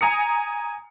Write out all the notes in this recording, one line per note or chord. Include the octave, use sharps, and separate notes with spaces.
G#5 A#5 D#6 C#7